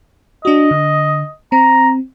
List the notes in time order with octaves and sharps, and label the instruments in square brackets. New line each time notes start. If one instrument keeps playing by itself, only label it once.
[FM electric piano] D4 F#4 [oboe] D#5
[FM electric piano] D3
[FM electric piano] C4 [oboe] A#5